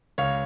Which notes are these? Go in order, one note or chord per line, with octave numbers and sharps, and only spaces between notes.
C#2 C#5 F5